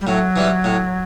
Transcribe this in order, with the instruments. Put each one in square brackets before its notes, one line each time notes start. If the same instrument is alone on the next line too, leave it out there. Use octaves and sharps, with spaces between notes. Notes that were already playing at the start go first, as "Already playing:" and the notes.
[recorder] G3
[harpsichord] A2 [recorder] F#3
[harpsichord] E3 G3
A2